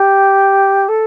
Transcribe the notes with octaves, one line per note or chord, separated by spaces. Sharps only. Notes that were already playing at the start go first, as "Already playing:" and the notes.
Already playing: G4
A4